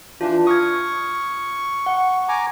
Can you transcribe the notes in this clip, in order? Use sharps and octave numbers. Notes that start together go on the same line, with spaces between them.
E3 D4 F4
C#6 D#6 F6 G#6
F#5
G#5 A#5 D6